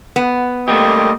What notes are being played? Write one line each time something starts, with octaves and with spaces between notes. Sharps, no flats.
B3
G3 A3 A#3 C4 G4 D#5